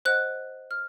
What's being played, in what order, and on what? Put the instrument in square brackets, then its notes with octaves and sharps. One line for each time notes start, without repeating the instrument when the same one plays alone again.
[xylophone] C5 D#5 F#5 F#6
F6